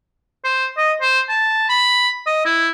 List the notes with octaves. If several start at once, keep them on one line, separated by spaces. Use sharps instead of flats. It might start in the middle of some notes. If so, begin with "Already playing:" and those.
C5
D#5
C5
A5
B5
D#5
E4